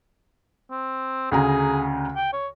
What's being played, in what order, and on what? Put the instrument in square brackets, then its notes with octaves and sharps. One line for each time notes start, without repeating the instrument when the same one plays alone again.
[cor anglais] C4
[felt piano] D2 C#3 A#5 [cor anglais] G#4
[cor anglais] G5
C#5